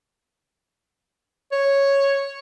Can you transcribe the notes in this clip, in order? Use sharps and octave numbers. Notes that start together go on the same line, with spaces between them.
C#5